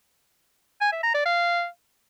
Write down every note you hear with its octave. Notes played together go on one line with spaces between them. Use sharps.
G#5
E5
A#5
D5
F5